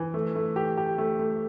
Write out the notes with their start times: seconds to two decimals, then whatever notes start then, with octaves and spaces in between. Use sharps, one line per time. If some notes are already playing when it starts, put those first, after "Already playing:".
Already playing: E3
0.14 A3
0.35 A3
0.56 G4
0.77 G4
0.98 A3
1.19 A3